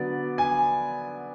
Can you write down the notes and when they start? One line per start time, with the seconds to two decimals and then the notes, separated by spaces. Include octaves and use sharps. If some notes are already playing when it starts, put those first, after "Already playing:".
Already playing: D3 F#3 B3 D5
0.38 G#5